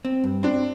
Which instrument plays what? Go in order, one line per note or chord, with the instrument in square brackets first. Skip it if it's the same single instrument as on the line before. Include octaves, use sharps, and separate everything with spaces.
[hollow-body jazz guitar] C4
G2
[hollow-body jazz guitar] C4 [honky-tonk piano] D4